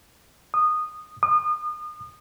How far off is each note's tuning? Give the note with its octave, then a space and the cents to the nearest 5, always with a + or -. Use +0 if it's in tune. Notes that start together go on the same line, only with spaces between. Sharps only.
D#6 -15
D#6 -35